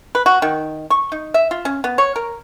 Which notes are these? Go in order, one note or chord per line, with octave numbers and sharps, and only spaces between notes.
B4
F#4
D#3
C#6
D#4
E5
F4
C#4
B3
C#5
A#4